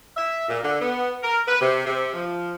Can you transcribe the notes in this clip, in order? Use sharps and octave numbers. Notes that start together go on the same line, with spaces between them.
E5
A#2
D3
B3
A#4
B4
C3
C3
F3